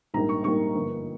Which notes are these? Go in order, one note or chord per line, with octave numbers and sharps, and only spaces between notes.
A#1 G#2 G3 A#3 A#5
C#6
A#1 G#2 G3 A#3 C#6
G1 G2 F3 A#3